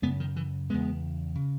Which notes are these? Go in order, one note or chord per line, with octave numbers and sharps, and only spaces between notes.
F#2 C#3 G#3 B3
D#3
E3
E2 C#3 G#3 B3
C#3